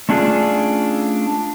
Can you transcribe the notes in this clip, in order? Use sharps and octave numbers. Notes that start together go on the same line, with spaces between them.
A3 C#4 D4 F4 G4 G#4